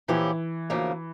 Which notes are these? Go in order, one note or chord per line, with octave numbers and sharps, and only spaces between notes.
A#2 E3 F3 C#4 E4 G4
D2 C#3 F3 A#3